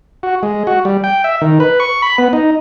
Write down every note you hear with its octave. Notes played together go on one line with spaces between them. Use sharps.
F#4
G#3
F#4
G3
G5
E5
D#3
B4
C#6
B5
B3
D#4